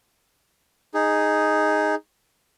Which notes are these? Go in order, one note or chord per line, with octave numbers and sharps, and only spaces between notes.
D#4 G#4